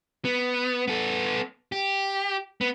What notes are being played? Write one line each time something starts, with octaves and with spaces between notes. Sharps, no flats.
B3
B3 A4
G4
B3